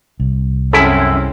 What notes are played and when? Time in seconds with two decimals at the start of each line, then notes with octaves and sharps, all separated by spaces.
0.20 C2
0.73 F#2 C4 C#4 E4 G#4 A4 B5